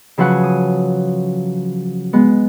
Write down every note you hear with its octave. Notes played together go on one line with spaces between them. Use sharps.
C#3 F3 F#3 B4 F#5 G#5
D#6
G#3 B3